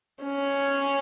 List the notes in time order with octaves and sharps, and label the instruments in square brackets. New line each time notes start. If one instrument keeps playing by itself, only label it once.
[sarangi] C#4